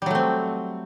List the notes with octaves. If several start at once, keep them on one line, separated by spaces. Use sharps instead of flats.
F#3 G3 A3 C4